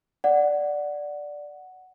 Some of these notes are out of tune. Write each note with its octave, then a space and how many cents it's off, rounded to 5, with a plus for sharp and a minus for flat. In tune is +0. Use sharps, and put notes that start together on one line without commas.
D5 +0 F#5 +0